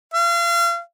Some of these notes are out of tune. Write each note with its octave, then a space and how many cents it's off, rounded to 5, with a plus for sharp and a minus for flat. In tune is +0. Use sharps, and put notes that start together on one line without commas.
F5 -35